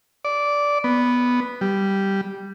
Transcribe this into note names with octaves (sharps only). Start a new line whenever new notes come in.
D5
B3
G3